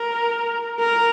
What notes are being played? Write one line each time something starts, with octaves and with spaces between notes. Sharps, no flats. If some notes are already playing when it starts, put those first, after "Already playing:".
Already playing: A#4
A#4